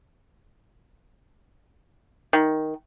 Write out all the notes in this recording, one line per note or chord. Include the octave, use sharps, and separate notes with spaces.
D#3